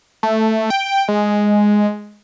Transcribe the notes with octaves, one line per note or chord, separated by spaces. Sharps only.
A3
G5
G#3